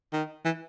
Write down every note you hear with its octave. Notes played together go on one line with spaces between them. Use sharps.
D#3
E3